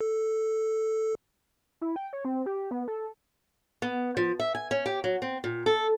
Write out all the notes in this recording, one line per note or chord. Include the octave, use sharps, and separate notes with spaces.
A4
E4
G5
C#5
C4
G4
B3
A4
B3
F3
E5
G#5
C#4
G4
F#3
C4
A#2
A4